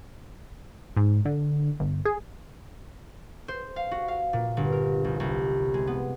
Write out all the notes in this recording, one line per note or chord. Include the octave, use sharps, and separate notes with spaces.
G#2
D3
G1
G#4
C5
F5
F#4
F5
A#2
G1
A#4
C2
C2
G#3
B3